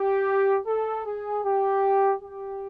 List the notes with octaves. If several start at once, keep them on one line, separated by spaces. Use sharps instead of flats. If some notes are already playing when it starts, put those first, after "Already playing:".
Already playing: G4
A4
G#4
G4
G4